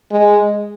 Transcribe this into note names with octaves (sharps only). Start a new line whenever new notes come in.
G#3